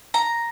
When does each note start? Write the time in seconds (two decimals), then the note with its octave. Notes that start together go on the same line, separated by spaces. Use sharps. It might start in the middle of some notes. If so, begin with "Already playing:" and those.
0.14 A#5